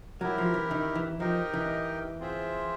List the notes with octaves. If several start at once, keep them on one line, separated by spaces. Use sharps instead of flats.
F#3 E4 G4 A#4
F3
E3
D#3
E3
F3 D#4 G4 A#4 D#5 G5
E3
C4 F4 G#4 C5 E5